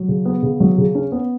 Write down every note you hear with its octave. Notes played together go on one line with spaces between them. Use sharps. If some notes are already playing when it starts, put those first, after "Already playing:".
Already playing: F#3
C#3
B3
C#3
F#3
C#3
C#4
B3